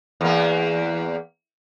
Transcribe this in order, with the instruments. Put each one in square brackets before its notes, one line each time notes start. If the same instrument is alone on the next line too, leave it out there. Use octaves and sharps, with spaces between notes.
[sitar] E2 A#3